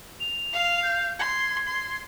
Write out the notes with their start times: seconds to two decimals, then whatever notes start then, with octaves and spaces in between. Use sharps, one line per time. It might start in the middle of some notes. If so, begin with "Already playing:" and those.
0.20 F7
0.53 F5
0.83 G6
1.19 C6 G#6
1.67 C6